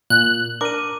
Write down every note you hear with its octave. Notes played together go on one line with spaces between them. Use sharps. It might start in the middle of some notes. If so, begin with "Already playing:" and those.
A#2 F#6
D4 A#4 D6 D#7